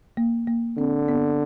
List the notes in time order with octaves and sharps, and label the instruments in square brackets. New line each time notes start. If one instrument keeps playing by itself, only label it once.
[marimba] A#3
A#3
[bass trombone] D3 [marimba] C4
[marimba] B3